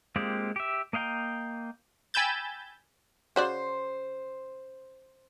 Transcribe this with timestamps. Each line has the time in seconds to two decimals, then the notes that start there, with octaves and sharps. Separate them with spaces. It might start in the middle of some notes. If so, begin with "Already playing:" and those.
0.16 G#3 A#3 C4 F4 G4
0.56 G4 E5
0.93 A#3 D#5 F5 G5 A#5
2.14 G5 G#5 B5 E6 G6 A6
3.36 C#3 F#4 C5 D5